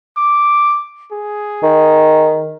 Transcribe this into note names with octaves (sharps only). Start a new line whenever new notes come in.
D6
G#4
D#3